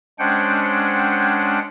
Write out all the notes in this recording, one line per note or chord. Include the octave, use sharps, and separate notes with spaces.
G#3 C#4 D4 C5 F#5 G5